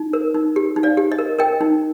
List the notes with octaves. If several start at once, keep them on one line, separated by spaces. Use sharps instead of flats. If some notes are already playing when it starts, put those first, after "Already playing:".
Already playing: D#4
A#4
D#4
G4
D#4
D5 F5
G4
D#5
A#4
A#4 D#5 G5
D#4